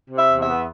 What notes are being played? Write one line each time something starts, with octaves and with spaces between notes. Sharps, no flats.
C3
E5
E2
E5
B3